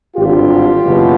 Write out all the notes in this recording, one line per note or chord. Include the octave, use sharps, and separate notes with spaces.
G#1 G2 D3 F4 G4
F#1 E2 B2